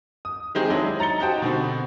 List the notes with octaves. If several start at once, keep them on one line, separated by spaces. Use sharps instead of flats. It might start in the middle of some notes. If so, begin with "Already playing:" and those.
D#6
D#3 G#3 C4 D#4 G4 G#4
F#3 G#3 D4 E4
D#4 A#5 A6 C#7 G7
D#4 F#4 G4 C5 G5 A5
B2 D3 B3 C4